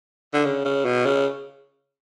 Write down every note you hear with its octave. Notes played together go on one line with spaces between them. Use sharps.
D3
C#3
C#3
B2
C#3